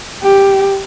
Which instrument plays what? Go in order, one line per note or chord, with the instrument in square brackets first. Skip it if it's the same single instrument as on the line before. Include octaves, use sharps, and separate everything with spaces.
[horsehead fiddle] G4